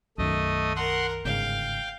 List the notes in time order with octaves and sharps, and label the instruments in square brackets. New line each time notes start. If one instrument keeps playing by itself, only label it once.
[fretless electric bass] B1 F#2 D#3 [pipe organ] A3 D#5
[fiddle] A#4 [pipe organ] F#5 C6
[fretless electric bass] G1 G#2 C#3 [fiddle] F5 [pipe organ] G5